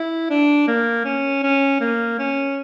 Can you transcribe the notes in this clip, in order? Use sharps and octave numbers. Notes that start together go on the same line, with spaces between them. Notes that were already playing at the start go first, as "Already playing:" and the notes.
Already playing: E4
D4
A#3
C#4
C#4
A#3
C#4